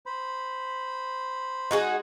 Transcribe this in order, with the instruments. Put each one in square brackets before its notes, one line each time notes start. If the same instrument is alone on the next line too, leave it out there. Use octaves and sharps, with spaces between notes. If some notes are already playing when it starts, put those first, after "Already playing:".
[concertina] C5 B5
[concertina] G#3 [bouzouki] D#4 F#4 G#4